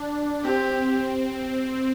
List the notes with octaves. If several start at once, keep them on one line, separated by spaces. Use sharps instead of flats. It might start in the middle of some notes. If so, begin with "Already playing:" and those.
Already playing: D4
C4 G4